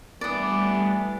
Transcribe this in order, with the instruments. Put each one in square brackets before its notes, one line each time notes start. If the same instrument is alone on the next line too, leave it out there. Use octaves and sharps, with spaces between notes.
[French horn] E3 [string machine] G3 A3 A6 [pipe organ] B3 D4 [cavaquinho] D5 D#6